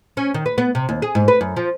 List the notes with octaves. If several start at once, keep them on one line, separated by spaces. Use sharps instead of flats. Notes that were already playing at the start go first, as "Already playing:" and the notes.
C#4
D#3
B4
B3
C3
D#2
G#4
G#2
B4
F#2
F3